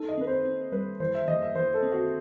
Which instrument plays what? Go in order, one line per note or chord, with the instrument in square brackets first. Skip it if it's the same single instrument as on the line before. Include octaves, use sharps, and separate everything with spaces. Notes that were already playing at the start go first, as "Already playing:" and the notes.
Already playing: [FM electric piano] D#4 [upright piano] A4
[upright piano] D#5
[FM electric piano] C4 [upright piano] B4
[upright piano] C5
[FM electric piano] C4
[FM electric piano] G3 [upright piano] B4
[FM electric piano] E3 [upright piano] C5
[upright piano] E5
[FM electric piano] E3 [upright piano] D#5
[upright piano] E5
[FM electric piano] E3 [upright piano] C5
[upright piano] A4
[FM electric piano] C4
[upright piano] F#4